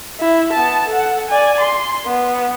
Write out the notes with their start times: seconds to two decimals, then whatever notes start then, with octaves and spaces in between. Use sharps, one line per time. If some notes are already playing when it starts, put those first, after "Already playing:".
0.20 E4
0.53 B3 A5
0.88 A4 F#5
1.29 D5 G#5
1.60 C6
2.06 B3